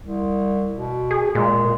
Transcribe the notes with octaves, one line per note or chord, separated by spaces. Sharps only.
C2
B2
G#4
A#2 G#3